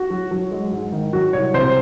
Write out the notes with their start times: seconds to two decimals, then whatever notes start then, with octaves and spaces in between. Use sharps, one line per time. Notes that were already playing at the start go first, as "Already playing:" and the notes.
Already playing: F#4
0.10 F#3
0.31 F#3
0.51 G#3
0.72 G#2
0.92 D#3
1.13 F#3 F#4
1.33 C2 C#5
1.54 C3 C5